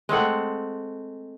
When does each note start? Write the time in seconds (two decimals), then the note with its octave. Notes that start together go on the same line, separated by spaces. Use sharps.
0.09 G#3 A3 C4 F#5